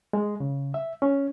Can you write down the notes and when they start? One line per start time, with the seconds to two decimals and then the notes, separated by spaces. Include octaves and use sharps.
0.13 G#3
0.40 C#3
0.74 E5
1.02 C#4